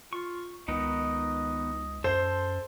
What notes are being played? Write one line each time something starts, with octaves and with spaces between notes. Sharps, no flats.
F4 C#6
C#2 D#3 B3 D#4 D#5
F#2 A4 C5 C6